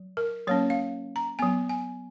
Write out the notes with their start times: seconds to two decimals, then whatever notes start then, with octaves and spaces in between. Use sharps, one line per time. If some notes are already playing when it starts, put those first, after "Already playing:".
Already playing: F#3
0.17 A#4
0.47 F#3 A#3 C#4 C#5
0.70 F5
1.16 A#5
1.39 F#3 B3 G#5
1.69 G#5